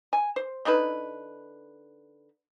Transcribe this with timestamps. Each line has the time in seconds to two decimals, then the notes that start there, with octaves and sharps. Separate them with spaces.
0.13 G#5
0.36 C5
0.65 D3 D#4 E4 B4